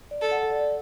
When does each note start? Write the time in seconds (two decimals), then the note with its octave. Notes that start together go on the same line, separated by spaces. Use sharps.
0.11 D5
0.21 A4
0.32 F#5
0.51 D5